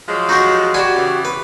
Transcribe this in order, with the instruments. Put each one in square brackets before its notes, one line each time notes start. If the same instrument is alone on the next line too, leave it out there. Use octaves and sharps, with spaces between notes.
[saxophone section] F3 F#3 G#3
[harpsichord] D#4 F#4 G4
[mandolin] F#4 G4 D5 [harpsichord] F#5 G#5 B5
[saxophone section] C#3 E3
[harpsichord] B4